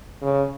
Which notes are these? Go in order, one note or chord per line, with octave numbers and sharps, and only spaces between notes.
C#3